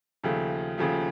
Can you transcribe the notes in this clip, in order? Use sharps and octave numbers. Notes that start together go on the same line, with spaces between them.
D#2 C#3 F3 A3
D#2 C#3 F3 A3